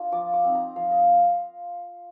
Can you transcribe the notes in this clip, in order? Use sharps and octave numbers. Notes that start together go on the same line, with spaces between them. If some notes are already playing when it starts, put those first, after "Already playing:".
Already playing: A#3 D4 F4
F3 D6
D6
C4 D#4
A#5
F3 F5
D#5